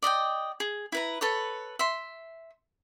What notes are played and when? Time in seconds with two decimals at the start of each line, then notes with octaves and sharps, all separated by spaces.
0.03 D5 D#5 F#5 G5
0.60 G#4
0.92 E4 B4 A#5
1.21 A4 B4 C#5
1.79 E5 C6